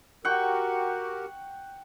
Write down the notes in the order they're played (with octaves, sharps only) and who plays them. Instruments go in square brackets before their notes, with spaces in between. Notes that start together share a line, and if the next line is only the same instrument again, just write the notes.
[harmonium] F#4 G4 A#4 [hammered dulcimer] F#5 G5 C#6